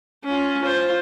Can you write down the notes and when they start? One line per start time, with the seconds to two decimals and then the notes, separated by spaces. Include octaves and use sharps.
0.25 C#4 F4
0.62 F4 C5